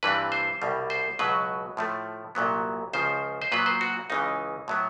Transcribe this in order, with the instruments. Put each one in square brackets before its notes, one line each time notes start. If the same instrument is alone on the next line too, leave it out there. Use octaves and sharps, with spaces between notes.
[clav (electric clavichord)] G2 E3 G3 C4 B4
C5
C2 B2 G3
C5
C#2 B2 F#3 B4
A2 F3 A3
C2 A#2 F#3 B3
C#2 C#3 F3 C5
C5
A#2 F#3 B3 B4
C5
F#4
C#2 C#3 E3 D#4
A2 F#3 B3